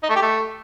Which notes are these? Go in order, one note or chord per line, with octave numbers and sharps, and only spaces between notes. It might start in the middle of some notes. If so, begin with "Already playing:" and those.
D#4
A3
G4
A3